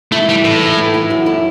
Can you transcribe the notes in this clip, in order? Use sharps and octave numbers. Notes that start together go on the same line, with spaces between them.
A3 E4
E3 G3
A2 A3
E3
A3
E4
F#2
E4